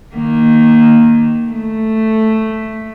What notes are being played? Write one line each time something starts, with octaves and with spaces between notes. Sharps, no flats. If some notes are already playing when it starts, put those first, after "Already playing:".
D#3 A#3
A3